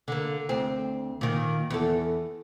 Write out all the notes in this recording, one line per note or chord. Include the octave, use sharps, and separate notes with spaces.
D3 A#3
D2 C4
A#2 D#3
E2 A4